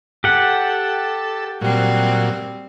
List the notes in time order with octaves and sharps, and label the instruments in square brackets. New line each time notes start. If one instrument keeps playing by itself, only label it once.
[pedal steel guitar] G4 F#5 [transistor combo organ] A4
[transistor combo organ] A#2 F#3 [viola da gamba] G3 C4